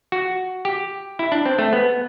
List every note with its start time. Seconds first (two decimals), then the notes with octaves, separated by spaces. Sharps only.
0.12 F#4
0.65 G4
1.19 E4
1.32 D4
1.45 C4
1.59 A3
1.73 B3